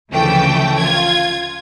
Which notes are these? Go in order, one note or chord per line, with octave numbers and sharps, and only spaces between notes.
D2 C#3 E3 F3 A3 G5
F4 G#6